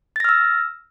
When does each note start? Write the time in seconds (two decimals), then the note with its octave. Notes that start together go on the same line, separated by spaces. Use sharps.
0.16 A6
0.20 A#6
0.24 F6
0.29 E6